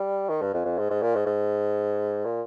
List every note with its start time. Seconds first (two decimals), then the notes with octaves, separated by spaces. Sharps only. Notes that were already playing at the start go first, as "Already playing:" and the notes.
Already playing: G3
0.29 D#3
0.42 G2
0.54 F2
0.65 F2
0.78 G#2
0.90 G#2
1.02 A#2
1.15 G#2
1.26 G#2
2.25 A#2